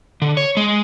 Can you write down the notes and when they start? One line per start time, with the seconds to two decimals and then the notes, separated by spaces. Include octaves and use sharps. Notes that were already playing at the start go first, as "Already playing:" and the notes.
0.22 D3
0.37 C#5
0.57 G#3